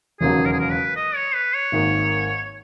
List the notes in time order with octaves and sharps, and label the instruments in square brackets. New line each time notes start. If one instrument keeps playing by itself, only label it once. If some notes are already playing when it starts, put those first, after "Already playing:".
[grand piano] E1 D#2 C#3 F#3 [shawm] G#4
[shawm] A#4
G#4
A#4
B4
D#5
C#5
B4
C#5
[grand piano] G#1 G#2 D#3 A#3